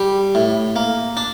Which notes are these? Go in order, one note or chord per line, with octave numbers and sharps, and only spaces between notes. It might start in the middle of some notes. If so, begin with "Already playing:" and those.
Already playing: G3
A2
A#3
D4